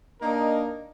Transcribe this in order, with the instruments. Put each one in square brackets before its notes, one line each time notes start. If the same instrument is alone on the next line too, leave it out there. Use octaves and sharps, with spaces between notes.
[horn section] A#3 D4 D#4 A#4 D#5